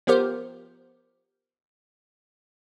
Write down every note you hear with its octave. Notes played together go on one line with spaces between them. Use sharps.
F3 B3 F4 G4 A#4 C5